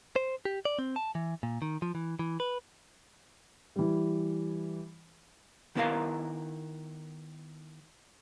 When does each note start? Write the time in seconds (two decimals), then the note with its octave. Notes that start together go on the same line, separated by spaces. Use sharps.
0.16 C5
0.45 G4
0.65 D5
0.79 C4
0.96 A5
1.15 E3
1.43 A#2
1.62 D#3
1.82 F3
1.95 E3
2.19 E3
2.40 B4
3.76 E3 G3
5.75 D#3 B3 E4 A#4 F5 A#5